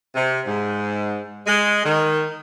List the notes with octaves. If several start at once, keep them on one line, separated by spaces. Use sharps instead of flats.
C3
G#2
G#3
D#3